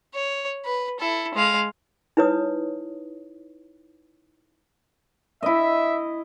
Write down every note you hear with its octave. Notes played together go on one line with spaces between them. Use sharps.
C#5
B4
E4 A4
G#3 F5
D#4 E4 B4 C#5 D#6
E4 D#5 E5